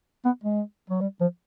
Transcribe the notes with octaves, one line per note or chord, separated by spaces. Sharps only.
B3
G#3
F#3
G3
F3